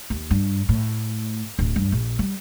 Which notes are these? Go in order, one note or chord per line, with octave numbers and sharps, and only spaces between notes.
D#2
G2
A2
D1
G2
A#1
G3